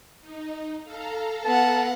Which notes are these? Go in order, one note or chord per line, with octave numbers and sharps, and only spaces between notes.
D#4
A4 F5 A#5
B3 F#5 A5